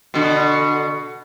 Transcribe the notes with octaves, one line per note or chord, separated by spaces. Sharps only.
B2 D3